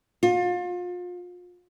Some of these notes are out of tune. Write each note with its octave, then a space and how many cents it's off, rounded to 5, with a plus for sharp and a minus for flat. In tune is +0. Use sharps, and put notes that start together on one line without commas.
F4 +35